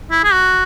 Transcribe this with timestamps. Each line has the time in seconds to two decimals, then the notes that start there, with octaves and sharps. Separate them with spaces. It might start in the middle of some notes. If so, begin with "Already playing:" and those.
0.11 E4
0.24 G#4
0.33 F#4